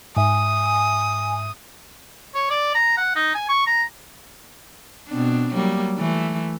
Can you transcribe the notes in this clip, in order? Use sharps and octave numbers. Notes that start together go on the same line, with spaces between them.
G#2 E5 G#5 D#6
C#5
D5
A#5
F#5
D#4
G#5
C#6
A#5
B2 C4 D4
F#3 G3 A#3
E3 A3